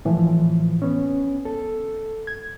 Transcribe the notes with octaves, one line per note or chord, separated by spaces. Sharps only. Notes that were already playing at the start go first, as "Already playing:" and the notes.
A2 E3 F3
B3 C#4
A4
G#6